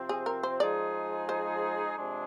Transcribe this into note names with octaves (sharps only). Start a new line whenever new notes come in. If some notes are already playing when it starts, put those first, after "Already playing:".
Already playing: C3 F3 C4
G#4
A#4
C5
F3 G#3 D#4 G#4 D5
C5
C3 F3 G#3 D4 G#4